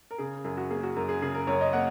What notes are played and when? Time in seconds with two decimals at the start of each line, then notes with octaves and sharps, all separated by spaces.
0.11 A#4
0.18 C#3 G#4
0.44 F#2 G#4
0.57 F#4
0.70 A#3 G#4
0.83 F#4
0.96 F#2 A#4
1.09 G#4
1.22 C#3 G#4
1.34 A#4
1.47 F#2 C#5
1.61 D#5
1.73 A#3 F#5